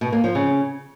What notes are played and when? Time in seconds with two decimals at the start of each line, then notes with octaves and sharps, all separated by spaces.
0.01 B2
0.12 A#3
0.24 F3
0.35 C#3